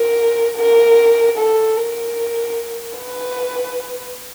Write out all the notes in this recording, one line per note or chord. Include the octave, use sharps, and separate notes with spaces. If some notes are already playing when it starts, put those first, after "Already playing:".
Already playing: A#4
A#4
A4
A#4
B4